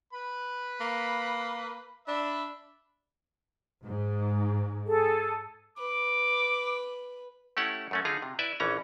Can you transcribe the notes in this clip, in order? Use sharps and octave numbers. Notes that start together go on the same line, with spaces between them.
B4 B5
A#3
D4 E5 B5
G#2
G#4 A4
B4 D6
A3 C#4 E4 G4 F#5
F#2 A3 C#4
D3 D#4 F4 G#4 A#5
C3
E4 B4 D5 E5
A#1 E3 C#4 A#5